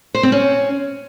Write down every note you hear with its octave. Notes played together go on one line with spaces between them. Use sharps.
C5
C4
C#4